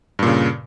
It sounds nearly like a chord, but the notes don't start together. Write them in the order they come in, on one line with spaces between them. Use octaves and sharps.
G2 A#2 C#3